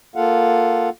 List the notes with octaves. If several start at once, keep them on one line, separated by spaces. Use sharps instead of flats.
A#3 F4 A4 F5 F#5